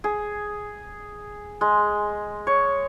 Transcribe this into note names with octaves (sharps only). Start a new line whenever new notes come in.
G#4
G#3
C#5